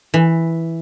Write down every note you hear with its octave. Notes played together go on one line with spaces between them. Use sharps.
E3